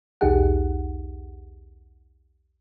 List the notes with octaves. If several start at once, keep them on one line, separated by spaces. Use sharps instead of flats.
B1 E2 D#4 G4 G#4 F#5